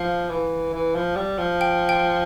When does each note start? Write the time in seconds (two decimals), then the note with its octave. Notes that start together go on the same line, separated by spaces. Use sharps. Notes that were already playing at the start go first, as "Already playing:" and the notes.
Already playing: F3 F5
0.30 E3
0.73 E3
0.95 F3
1.16 G3
1.38 F3
1.61 G5
1.89 G5